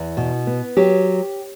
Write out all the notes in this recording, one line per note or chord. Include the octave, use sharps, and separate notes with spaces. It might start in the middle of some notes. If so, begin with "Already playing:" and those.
Already playing: E2
B2
B3
F#3 G4